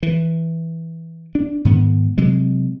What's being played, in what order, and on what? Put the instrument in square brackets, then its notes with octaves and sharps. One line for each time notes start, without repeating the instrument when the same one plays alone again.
[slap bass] E3
D4
G#2 D#3 B3
C3 F#3 G#3